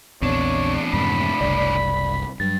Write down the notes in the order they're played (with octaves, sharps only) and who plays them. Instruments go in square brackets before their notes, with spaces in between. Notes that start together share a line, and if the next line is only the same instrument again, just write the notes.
[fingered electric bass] A#1 E2 [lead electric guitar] A2 D4 [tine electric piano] E3 B3 C4 [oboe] C#5
[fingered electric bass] F2 G#2 C3 [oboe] B5
[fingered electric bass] F#1 C2 [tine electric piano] D5
[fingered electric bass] G2 [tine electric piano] F#3 A6